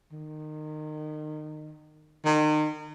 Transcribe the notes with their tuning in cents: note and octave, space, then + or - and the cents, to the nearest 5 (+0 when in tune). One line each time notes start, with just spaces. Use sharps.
D#3 -25
D#3 -35